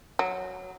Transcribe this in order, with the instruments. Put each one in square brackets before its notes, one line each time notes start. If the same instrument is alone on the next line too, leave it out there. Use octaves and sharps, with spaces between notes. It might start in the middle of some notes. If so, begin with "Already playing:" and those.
[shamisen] F#3